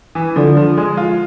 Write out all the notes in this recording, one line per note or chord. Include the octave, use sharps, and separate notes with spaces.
E3
D3 F3
F3
G#3
F4